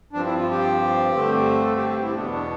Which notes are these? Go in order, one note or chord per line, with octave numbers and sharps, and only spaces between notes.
G2 F3 C4 D4
E4
F4
G4
G2 D3 A3 C4
A4
G4
G4
E4
E2 B2 B3 D4
D4